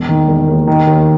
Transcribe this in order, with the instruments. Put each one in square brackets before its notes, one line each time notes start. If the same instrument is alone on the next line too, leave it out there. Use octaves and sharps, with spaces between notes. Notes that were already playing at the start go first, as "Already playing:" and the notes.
Already playing: [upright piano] E1
D#3
E1
D#2
D#3
D#2